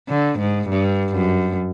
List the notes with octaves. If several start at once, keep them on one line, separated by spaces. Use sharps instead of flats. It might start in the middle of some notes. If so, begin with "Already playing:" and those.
D3
G#2
G2
F#2